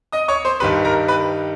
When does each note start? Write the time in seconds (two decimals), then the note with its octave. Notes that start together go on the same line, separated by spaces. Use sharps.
0.12 D#5 D#6
0.28 C#5 C#6
0.45 C5 C6
0.60 G2 D#3 G3 B4 B5
0.85 A#4 A#5
1.08 B4 B5